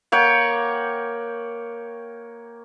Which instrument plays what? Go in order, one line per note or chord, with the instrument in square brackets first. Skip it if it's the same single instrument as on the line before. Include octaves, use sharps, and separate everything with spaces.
[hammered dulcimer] A#3 C#5 F#5 G5